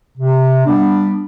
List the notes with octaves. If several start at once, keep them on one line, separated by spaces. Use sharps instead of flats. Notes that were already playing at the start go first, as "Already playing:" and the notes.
C3
G3 B3 D4